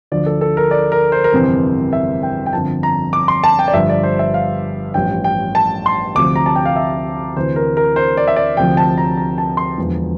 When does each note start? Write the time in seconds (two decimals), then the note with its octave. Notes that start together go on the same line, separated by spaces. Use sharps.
0.12 D2 D3 F3 D5
0.26 A4
0.41 A4
0.57 A#4
0.71 D5
0.92 A#4
1.12 C5
1.24 A#4
1.33 G1 F2 C3 E3 C5
1.93 E5
2.23 G5
2.46 G5
2.53 G1 F2 D3 F3 A5
2.83 A#5
3.13 D6
3.28 C6
3.44 A5
3.59 G5
3.68 D5
3.73 G1 G2 F3 E5
3.89 D5
4.03 C5
4.19 E5
4.34 F5
4.94 A1 G2 F3 G5
5.24 G5
5.55 A5
5.86 C6
6.15 D2 C3 F3 D6
6.36 A#5
6.46 A5
6.56 G5
6.66 F5
6.76 E5
7.36 D2 C3 E3 C5
7.56 A#4
7.77 A#4
7.96 C5
8.17 D5
8.28 E5
8.36 D5
8.57 D2 C3 F3 G5
8.77 A5
8.98 A#5
9.17 A#5
9.38 A5
9.57 C6
9.78 E1 E2 D3 F3